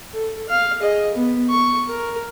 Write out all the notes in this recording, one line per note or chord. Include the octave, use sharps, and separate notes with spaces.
A4
F5
G#4 D#5
B3
C#6
A#4